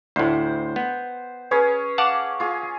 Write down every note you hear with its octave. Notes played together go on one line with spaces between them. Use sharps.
D2 A2 C5
B3
C#4 G#4 B4 C#5
F5 F#5 A5 D6
F4 G#4